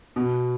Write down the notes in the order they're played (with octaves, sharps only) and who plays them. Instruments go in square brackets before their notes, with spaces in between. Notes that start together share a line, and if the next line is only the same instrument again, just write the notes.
[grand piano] B2